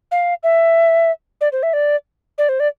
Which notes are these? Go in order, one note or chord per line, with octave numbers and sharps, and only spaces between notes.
F5
E5
D5
C5
E5
D5
D5
C5
D5